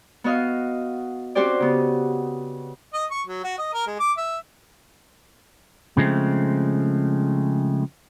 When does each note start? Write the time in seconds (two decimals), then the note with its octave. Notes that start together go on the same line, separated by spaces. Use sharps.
0.24 B3 F#4 D#5 F5
1.35 C4 C#4 F#4 G4 C5 D5
1.60 C#3 B3
2.93 D#5
3.11 C#6
3.27 F#3
3.44 F#4
3.58 D#5
3.74 A#4
3.87 G#3
4.00 D6
4.17 E5
5.97 C#3 F3 G#3 A3 C4